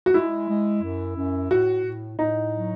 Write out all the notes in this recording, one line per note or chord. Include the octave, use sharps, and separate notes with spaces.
F#4
G#3 E4
G#3
F#2
F#2
A2 F#4
A2
A2 D#4
F#3